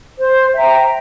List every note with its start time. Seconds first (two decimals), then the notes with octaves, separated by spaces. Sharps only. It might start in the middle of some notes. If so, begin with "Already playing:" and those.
0.18 C5
0.53 E5 G5 A#5